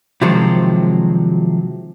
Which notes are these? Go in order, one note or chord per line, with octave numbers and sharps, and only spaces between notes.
C3 D#3 F3 F#3 G#3 C5